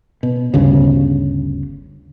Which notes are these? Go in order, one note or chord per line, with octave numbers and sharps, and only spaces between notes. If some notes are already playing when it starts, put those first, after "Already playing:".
B2
G1 D2 C#3